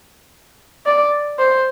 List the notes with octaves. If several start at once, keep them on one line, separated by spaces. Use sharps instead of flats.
D5
C5